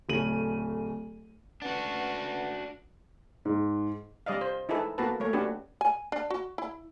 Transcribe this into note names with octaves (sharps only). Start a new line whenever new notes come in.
D1 C#3 A3 D#7 F#7
C#4 D4 F#4 B4 F#5
G#2
G3 D5 D#5 F5
C5
D#4 E4 G#4 A4 B4
A#3 B3 F#4 A4 B4 A5
A3 A#3 C#5
C#4 D4 F#4 G4 B4
G#5
D4
F#4
E4